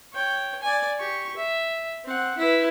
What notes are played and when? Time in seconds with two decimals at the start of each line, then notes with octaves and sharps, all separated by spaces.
0.13 C#5 G5
0.62 D5 G#5
0.99 G4 C#6
1.36 E5
2.04 C4 F#5
2.37 E4 B4